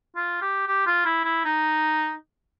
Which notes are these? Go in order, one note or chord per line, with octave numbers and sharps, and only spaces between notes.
F4
G4
G4
F4
E4
E4
D#4